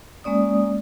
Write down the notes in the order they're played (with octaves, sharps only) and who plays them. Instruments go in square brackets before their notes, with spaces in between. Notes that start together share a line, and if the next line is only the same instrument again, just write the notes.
[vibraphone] G#3 A#3 C#4 D5 D#6